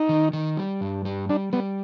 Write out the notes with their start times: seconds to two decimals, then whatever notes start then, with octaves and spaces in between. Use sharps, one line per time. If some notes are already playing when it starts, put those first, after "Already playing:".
Already playing: D#4
0.09 D#3
0.33 D#3
0.57 G3
0.81 G2
1.05 G3
1.29 G3 D4
1.53 G3 B3